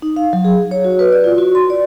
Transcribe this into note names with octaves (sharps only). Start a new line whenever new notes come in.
D#4
F5
F#3
G#4
C#5
F#4
B4
D5
F4
F#4
C6
D5